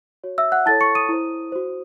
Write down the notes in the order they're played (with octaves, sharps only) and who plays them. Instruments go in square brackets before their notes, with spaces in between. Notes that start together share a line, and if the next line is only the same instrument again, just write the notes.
[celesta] F#4 C#5
E5 E6
F#5 F#6
E4 A4 C#5 A5 A6
C#6 C#7
D#6 D#7
E4 C5
F#4 C5